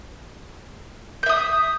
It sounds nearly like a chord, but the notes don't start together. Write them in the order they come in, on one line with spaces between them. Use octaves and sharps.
G6 E5 D#6